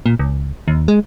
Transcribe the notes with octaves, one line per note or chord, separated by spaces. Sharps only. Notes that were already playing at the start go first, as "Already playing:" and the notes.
A#2
C#2
D#2
G#3